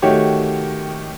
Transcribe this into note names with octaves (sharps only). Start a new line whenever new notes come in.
D#3 A3 F#4 G4 C#5